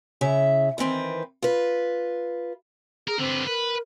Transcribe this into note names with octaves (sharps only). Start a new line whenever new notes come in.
C#3 E4 E5
D#3 E3 C4 B4
F4 B4
G#4 A#4
D3 B3 C4
A#4 B4